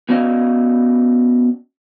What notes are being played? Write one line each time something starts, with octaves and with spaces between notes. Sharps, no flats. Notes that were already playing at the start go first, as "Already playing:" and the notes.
B3 C#4 F#4 D5 D#5 F5